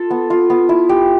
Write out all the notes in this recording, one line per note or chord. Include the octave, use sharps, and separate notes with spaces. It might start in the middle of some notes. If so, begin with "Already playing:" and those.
Already playing: F4 A4
B3
F4
B3
E4
G4